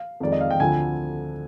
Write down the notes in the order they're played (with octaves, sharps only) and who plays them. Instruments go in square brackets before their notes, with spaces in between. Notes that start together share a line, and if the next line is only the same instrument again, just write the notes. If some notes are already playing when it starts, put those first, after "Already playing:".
Already playing: [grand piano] F5
F2 D#3 G#3 D5
D#5
F5
G5
D2 D3 F3 C4 G#5